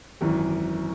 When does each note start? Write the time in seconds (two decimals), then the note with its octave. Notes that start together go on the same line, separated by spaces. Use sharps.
0.21 G#1 F#2 E3